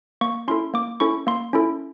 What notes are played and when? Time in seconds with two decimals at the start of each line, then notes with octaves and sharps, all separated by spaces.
0.21 A#3 C#6
0.48 C#4 E4 A4 C6
0.74 A#3 D6
1.00 C#4 E4 A4 C#6
1.27 A#3 C6
1.53 C#4 E4 A4